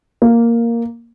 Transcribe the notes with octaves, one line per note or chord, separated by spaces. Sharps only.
A#3